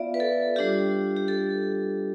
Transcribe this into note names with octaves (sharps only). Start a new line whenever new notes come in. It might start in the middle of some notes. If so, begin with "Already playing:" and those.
Already playing: B3 F4 D5 E5 F5
B4
A4
G3 D4 F4 G4
G4
A4